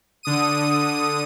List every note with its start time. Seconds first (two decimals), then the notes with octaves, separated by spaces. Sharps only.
0.23 D3 D#6 D#7